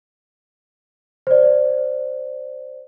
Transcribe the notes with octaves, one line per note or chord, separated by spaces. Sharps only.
C5 D5